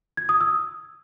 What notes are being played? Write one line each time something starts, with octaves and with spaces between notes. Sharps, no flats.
G#6
D#6
E6